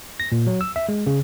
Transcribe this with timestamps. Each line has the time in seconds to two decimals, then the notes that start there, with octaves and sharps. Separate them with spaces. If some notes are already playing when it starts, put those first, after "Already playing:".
0.20 A#6
0.32 A#2
0.47 F#3
0.61 E6
0.76 E5
0.89 G#3
1.07 C#3